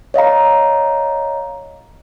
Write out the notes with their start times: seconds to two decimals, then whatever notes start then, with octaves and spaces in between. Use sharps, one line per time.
0.14 C#5 D#5 F5 A#5